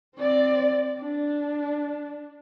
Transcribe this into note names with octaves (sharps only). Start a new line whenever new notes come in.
C4 D5
D4